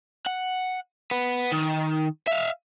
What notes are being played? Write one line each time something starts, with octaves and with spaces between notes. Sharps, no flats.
F#5
B3
D#3
E5 F5